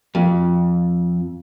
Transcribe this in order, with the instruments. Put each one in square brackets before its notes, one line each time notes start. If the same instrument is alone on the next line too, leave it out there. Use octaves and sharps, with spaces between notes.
[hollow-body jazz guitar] F2